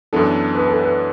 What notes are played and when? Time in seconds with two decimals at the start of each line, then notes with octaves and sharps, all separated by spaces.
0.13 F#2 E3 B3 D4 A4
0.55 B4
0.68 A4
0.81 B4